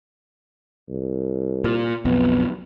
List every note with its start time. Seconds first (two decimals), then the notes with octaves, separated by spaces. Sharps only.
0.89 C2
1.64 A#2
2.05 B1 F2 B3